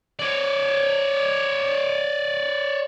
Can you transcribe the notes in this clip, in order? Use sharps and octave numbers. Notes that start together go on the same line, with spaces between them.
C#5 D5